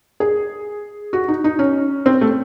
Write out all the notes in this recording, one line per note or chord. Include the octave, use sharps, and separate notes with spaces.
G#4
F#4
D#4
D#4
C#4
C4
A3